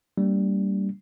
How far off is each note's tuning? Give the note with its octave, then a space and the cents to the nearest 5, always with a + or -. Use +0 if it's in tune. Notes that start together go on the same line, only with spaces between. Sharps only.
G3 -5 A#3 -25 D4 -45